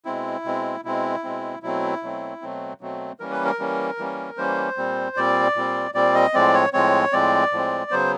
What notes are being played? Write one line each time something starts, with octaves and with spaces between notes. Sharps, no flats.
B2 G#3 C4 E4
B2 G#3 C4
B2 G#3 C4 E4
B2 G#3 C4
B2 F#3 A3 C4 E4
B2 F#3 A3 C4
B2 F#3 A3 C4
B2 F#3 A3 C4
E3 G3 A#3 C#4 A#4
B4
A#4
E3 G3 A#3 C#4
E3 G3 A#3 C#4
E3 G3 A#3 C#4 C5
A#2 G3 C4
A#2 G3 C4 D5
A#2 G3 C4
A#2 G3 C4 D5
D#5
A2 F3 G#3 C4 D5
C#5
A2 F3 G#3 C4 C#5
A2 F3 G#3 C4 D5
A2 F3 G#3 C4
C#3 F#3 B3 C5